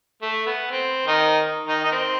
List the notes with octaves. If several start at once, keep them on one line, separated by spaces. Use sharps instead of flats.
A3
B3
C4
D#3 D#4
D#3 D#4
D#4
C4